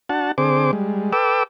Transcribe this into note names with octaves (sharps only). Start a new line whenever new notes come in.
D4 F#4 F#5 A5
D3 C4 G#4 C5 D6
G3 G#3
A4 B4 G5 D6 E6